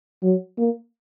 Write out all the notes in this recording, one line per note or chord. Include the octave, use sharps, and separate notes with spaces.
F#3
A#3